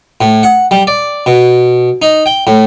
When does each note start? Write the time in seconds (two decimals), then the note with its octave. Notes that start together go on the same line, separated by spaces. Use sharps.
0.21 A2
0.43 F#5
0.71 G3
0.87 D5
1.26 B2
2.02 D#4
2.26 G5
2.47 A2